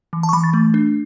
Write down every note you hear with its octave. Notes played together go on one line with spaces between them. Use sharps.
E3
A5
C#6
E3 B5
A6
A3
D4